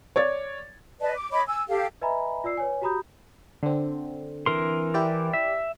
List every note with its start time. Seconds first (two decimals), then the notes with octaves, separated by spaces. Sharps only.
0.16 C#5 D5 A6
1.00 B4 D5 D#5 A5
1.15 D6
1.32 C#5 D#5 B5 D6
1.47 G#5 E6
1.68 G4 A4 F5
2.01 B4 D#5 E5 G#5 A#5 B5
2.44 F4 D5 E6 C7
2.57 B4 C#5 G#5
2.82 F#4 G4 A#5 B5 D#6 G6
3.63 D3 C4
4.46 E3 A#4 C6
4.94 E4 G4 D5
5.33 E5